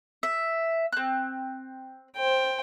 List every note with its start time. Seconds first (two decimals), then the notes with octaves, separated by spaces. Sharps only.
0.23 E5
0.92 C4 F#6
2.16 C5 G5